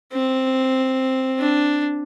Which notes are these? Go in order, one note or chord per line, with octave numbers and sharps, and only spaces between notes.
C4
D4